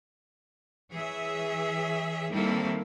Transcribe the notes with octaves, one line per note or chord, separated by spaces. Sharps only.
E3 G#4 C#5 E5
D#3 G3 A#3 C4 E4 A4